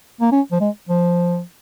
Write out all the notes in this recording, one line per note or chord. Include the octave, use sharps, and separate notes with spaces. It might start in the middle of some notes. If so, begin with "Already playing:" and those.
A#3
C#4
F3
G#3
F3